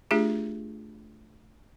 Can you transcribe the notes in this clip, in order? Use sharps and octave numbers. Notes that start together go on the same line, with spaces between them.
A3 D4 F4 G4 G#4